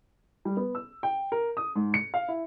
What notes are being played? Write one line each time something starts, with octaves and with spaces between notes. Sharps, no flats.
G3
B3
E6
G5
A#4
D#6
G#2
C#7
F5
E4